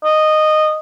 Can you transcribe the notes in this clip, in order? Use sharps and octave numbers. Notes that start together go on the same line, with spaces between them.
D#5